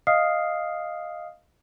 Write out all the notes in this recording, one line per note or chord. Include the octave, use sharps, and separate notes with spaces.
D#5 F5 D#6 F6 C7